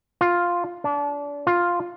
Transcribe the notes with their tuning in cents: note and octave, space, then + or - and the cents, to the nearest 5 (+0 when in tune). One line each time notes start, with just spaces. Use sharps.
F4 +5
D4 -30
F4 +5